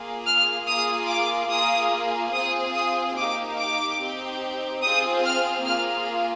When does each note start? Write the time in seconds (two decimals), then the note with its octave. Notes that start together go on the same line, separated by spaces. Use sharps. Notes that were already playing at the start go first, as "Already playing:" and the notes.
Already playing: A#3 F4 G#4
0.26 F6
0.67 A#3 F4 G#4 D#6
1.09 D6
1.51 A#3 F4 G#4 D#6
2.34 C4 F4 G#4 D#6
2.75 D#6
3.17 A#3 D#4 G4 D6
3.59 D6
4.00 C4 D#4 G4
4.83 C4 F4 G#4 D#6
5.24 F6
5.66 A#3 F4 G#4 F6